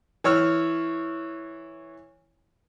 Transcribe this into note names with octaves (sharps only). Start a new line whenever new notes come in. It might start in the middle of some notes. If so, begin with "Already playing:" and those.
E3 C#5 E6 F6